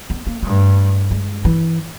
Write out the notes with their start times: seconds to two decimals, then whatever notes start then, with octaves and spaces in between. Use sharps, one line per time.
0.10 B3
0.27 A#3
0.43 G2 A3
1.11 G#3
1.45 E3